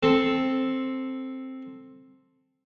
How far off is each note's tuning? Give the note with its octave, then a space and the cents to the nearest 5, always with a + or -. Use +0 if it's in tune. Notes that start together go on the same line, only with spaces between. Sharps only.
C4 +5 A4 +0